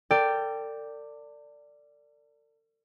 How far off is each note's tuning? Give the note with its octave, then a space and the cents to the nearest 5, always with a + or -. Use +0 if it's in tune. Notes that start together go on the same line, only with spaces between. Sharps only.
A4 +45 D5 +0 G5 +0